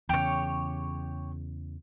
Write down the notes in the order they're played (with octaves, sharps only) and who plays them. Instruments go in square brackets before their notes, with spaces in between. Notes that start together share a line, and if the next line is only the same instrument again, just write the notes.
[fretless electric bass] E2 C#3 [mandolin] G4 C#5